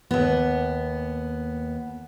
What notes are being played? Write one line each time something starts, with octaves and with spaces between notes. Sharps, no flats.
D#2 B3